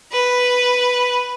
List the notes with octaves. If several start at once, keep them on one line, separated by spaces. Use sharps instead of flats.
B4